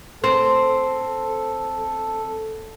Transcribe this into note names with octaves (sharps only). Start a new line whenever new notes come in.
C4 A4